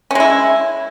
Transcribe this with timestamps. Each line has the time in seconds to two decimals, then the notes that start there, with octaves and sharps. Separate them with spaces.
0.11 C#4
0.15 G#3
0.20 E4